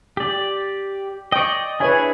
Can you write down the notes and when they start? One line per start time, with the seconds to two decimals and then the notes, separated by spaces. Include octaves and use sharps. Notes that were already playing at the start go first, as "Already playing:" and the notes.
0.17 G4 D5
1.32 D5 D#5 G5 C#6
1.80 D4 E4 G#4 B4 C#5 G#5